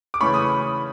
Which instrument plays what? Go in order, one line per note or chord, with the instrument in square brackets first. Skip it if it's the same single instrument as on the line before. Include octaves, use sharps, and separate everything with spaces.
[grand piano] D6
C#3 E3 A3 C#4 B5 C#6
D#6